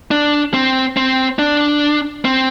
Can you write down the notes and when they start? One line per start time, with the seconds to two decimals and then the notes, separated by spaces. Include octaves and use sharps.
0.11 D4
0.54 C4
0.97 C4
1.39 D4
2.25 C4